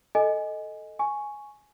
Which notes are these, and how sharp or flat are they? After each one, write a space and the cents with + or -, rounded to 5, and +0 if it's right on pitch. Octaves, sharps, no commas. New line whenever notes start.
A4 +0 D#5 +0 G#5 +0
G#5 +5 C#6 +0